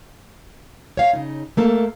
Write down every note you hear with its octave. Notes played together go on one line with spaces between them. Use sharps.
C#5 F5
C#3 D#4
A3 A#3 A4